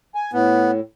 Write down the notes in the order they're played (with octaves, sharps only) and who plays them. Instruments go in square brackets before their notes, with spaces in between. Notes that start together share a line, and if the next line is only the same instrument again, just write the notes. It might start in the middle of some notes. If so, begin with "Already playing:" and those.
[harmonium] G#5
[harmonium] A2 [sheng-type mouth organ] B3